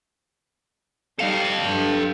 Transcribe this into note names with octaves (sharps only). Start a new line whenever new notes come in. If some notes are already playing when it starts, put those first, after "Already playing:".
G3 D#4 A4 F5
G2